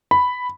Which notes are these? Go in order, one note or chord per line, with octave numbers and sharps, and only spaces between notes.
B5